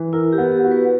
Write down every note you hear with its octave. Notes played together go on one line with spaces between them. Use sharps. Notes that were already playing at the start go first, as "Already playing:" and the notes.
Already playing: E3
E4 A#4
G4
B3
G4
F#4
B4